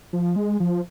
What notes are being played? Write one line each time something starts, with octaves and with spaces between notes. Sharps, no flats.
F3
G#3
F3